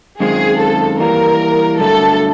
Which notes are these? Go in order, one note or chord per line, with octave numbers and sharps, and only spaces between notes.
F#2 D#3 G#3 C4 F4 G#4
A4
E3 G3 A#3 A#4
G2 D3 F#3 A3 A4